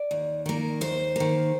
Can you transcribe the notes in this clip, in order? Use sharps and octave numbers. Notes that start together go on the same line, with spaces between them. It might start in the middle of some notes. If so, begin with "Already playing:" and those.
Already playing: D5
D#2
D#3 A#3
D#2 C5
D#3 A#3